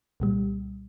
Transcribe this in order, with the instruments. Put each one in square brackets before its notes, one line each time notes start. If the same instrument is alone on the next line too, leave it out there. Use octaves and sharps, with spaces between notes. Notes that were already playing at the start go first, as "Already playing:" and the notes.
[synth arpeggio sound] C2 A#2 G3